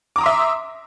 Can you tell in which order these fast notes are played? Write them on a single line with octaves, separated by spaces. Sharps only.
D6 A#5 D#6 C6 E5